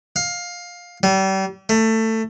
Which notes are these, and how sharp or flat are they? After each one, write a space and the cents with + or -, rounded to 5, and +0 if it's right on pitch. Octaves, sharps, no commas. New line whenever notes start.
F5 +15
G3 -35
A3 +20